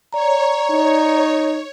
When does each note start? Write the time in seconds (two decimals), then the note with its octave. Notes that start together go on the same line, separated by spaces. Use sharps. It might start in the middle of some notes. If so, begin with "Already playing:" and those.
0.13 C#5 D5 A#5
0.70 D#4